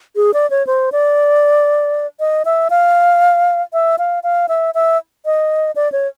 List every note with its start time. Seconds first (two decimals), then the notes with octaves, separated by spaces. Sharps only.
0.16 G#4
0.34 D5
0.50 C#5
0.67 C5
0.92 D5
2.20 D#5
2.45 E5
2.70 F5
3.73 E5
3.98 F5
4.23 F5
4.49 E5
4.75 E5
5.25 D#5
5.76 D5
5.92 C#5